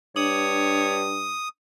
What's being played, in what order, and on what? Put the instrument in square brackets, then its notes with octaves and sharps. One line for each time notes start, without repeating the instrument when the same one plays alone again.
[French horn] G2 [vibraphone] D4 [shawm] C#5 [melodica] D#6